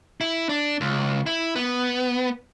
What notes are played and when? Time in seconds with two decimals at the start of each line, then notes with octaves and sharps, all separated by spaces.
0.21 E4
0.49 D4
0.81 C#2
1.26 E4
1.56 B3